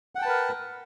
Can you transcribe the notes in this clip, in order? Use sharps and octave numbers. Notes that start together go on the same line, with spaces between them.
A#4 B4 F#5 G5 A5